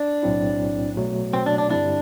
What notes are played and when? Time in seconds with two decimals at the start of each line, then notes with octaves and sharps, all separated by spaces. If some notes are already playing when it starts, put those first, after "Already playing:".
Already playing: D4
0.23 B1 A2 F#3 C4 E4
0.97 B2 F#3 A3
1.33 C4
1.46 D4
1.58 D4
1.70 G2 D3 G3 C4 D4 E4